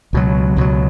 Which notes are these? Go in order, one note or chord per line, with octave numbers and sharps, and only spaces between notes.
C#2 B2 F#3
C#2 B2 F#3